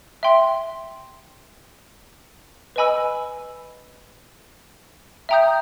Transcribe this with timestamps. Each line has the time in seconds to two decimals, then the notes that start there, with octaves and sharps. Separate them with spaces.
0.23 E5 G5 C6
2.76 B4 D#5 G#5 B5 E6
5.29 E5 G5 A#5 D#6 G6